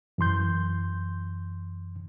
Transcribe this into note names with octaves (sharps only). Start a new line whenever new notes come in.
F#2 E3 C6 G6